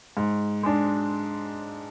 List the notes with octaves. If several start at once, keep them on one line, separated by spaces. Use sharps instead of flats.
G#2
G#3 D4